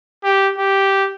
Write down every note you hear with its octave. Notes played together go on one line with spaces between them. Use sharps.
G4
G4